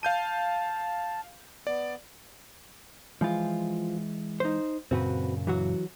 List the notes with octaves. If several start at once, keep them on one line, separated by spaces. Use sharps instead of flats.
F5 A5 G6 D#7
B3 D5
E3 F3 G#3 F4
D#4 C5
F#2 A#2 C#3 C4 F#4 B4
E3 F#3 F#4